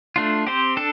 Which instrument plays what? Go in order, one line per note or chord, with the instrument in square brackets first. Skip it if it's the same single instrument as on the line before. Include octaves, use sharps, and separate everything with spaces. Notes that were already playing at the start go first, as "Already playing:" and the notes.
[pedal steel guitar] A3 D4 F4
C4 G4 C5
D4 A4